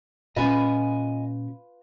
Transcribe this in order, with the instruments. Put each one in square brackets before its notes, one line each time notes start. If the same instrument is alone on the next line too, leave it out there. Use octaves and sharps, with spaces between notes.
[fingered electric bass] A#2 C4 C#4 [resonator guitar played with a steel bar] F4 B4 [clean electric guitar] D#5 G#5